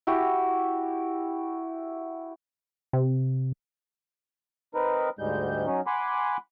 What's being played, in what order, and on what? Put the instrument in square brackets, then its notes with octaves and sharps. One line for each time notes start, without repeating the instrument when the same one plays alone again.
[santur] E4 F#4 G4
[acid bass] C3
[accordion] C4 D#4 A#4 B4
D2 G#2 G3 G#3 G6
F#3 C#4 D#4
F#5 G#5 B5 C6 D6